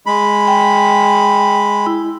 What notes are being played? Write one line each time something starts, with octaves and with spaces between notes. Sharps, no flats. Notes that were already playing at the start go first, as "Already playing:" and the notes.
G#3 B5
G5
E4